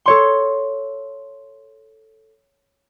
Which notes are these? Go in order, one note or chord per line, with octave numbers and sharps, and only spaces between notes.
A4 C#5 C6